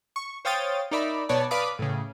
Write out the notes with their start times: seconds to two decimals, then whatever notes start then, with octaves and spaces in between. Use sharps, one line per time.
0.16 C#6
0.45 C5 C#5 F5 G5 D#6 A6
0.91 D#4 A#4 D5 E5 B5
1.29 B2 B3 C#5 D5 A5
1.51 B4 D5 F5 B5 D6 D#6
1.79 A2 C#3